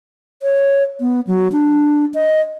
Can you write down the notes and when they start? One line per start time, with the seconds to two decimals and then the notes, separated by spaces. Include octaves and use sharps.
0.43 C#5
1.00 B3
1.27 F#3
1.52 D4
2.14 D#5